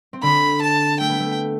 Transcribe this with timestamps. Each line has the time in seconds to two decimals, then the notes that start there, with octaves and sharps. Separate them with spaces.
0.13 C4
0.22 D3 D4 B5
0.62 A5
1.00 A3 G5
1.10 B3
1.20 A3